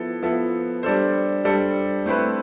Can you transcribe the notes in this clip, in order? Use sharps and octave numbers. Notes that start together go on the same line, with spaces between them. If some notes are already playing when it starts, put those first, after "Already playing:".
Already playing: F3 B3 E4 A4
F3 B3 E4 A4
G3 D4 A4 C5
G3 D4 A4 C5
A3 C4 E4 B4